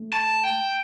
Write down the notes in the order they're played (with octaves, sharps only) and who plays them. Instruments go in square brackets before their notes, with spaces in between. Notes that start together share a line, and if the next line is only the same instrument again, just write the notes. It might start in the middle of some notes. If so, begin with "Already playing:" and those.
Already playing: [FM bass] A3
[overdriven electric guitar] A5
G5